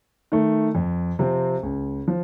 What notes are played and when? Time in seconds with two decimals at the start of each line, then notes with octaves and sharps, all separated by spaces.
0.32 D#3 A3
0.75 F2
1.19 C3 F3 C4
1.63 C#2
2.08 F3